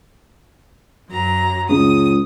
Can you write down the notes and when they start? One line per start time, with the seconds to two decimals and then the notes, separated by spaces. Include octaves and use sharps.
1.10 F#2 F#3 A#5
1.69 C#2 D#6